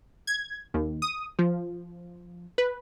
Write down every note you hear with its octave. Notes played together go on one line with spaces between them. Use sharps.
G#6
D#2
D#6
F3
B4